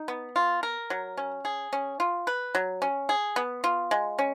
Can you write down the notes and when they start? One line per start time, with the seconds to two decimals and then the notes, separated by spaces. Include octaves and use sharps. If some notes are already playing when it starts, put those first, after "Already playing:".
Already playing: D#4
0.08 B3
0.36 F4
0.63 A#4
0.90 F#3
1.17 C#4
1.45 G#4
1.73 C#4
2.00 F4
2.27 B4
2.55 F#3
2.82 C#4
3.09 G#4
3.36 B3
3.64 F4
3.91 G#3
4.19 C#4